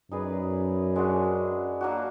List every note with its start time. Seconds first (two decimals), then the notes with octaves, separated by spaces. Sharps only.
0.11 F#2 D#4 G#4 B4 D5
0.96 G#3 D4 F#4
1.81 F#3 A#3 D4 F#4